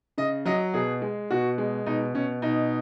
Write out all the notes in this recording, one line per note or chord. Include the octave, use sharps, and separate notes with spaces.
C#3 D#5
F#3 D#5
B2 G#4
G#3
B2 F#4
G#3
B2 D#4
B2 C#4
B2 D#4